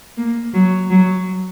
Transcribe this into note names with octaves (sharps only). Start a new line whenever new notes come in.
A#3
F#3
F#3